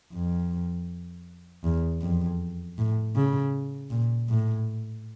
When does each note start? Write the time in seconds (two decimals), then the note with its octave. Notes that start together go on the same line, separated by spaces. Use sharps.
0.13 F2
1.64 E2
2.02 F2
2.78 A2
3.15 C#3
3.91 A#2
4.29 A2